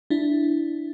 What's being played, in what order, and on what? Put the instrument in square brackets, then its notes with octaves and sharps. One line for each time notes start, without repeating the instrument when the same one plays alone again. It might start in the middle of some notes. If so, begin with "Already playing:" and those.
[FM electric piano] D4 E4